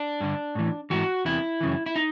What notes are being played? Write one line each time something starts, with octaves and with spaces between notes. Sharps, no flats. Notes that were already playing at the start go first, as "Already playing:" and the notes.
Already playing: D4
G2 D3
A2 E3
G#2 E3 F#4
E2 C3 E3 E4
F#2 C#3 E3
E4
D#4